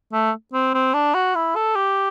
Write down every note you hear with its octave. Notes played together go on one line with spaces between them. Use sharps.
A3
C4
C4
D4
F#4
E4
A4
G4